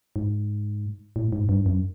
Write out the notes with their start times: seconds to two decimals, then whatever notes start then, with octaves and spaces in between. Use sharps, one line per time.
0.16 G#2
1.16 A2
1.33 G#2
1.49 G2
1.66 F#2